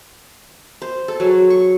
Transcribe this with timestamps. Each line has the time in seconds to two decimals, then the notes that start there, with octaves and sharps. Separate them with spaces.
0.82 C5
1.08 A4
1.20 F#3 G#4 C#5
1.50 C#6